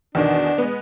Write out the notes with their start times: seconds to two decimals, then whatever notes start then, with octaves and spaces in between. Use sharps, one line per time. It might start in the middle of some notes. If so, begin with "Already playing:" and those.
0.15 E2 B2 D#3 D4
0.58 G#3 B3